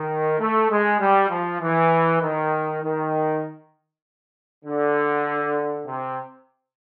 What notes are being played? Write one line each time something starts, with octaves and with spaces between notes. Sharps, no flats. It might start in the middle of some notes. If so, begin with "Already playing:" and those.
Already playing: D#3
A3
G#3
G3
F3
E3
D#3
D#3
D3
C3